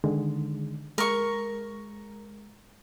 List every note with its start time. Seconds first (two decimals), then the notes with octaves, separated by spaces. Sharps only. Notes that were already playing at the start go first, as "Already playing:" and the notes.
0.04 D3 D#3 G#3
0.98 G#3 A#4 C#6